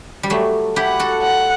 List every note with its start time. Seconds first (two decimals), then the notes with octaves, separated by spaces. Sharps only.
0.23 G3
0.30 F#3 A3
0.76 E4 G4 F#5
0.99 F#4 A4
1.22 F#5